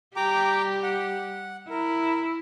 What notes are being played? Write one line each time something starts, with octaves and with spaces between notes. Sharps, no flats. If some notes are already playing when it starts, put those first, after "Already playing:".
G3 G4 G5 A#5 D6
F#5
E4 A#4